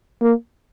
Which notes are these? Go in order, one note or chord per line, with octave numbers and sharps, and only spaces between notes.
A#3